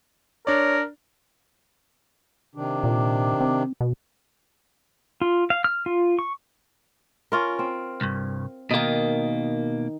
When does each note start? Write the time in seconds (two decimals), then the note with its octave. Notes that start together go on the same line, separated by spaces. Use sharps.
0.47 D4 A#4 C#5 D5
2.55 C3 D#3 D4
2.84 A#2
3.41 C4
3.81 B2
5.21 F4
5.50 F5
5.64 F6
5.86 F4
6.19 C#6
7.32 C#4 F4 A#4
7.59 C4
8.01 C2 G2
8.71 B2 D#3 A#3 D#4